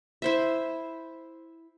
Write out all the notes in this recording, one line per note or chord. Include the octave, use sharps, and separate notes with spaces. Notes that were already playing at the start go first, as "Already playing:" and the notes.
E4 C5 E5